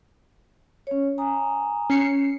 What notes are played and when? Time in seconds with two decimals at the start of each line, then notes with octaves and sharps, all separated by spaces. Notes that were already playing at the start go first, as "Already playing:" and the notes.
0.87 C#4 C#5
1.18 G#5 A#5 D#6
1.90 C#4 C7 C#7